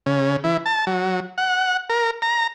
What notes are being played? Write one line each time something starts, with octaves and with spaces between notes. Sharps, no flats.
C#3
E3
A5
F#3
F#5
A#4
A#5